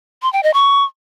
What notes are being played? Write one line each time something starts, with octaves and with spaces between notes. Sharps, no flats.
C6
G5
D#5
C#6